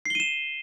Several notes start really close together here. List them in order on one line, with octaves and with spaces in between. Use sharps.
C7 G7 D#7 E7